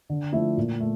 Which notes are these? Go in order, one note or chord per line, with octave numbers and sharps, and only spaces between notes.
D3
F3 A3 E4
A#2
A3